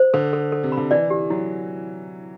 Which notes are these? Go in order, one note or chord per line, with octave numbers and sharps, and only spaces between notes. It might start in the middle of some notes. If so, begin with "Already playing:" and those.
Already playing: C5
D3 A4
A4
A4
C3
B5
D3
E3 D5
G4
F#3 E4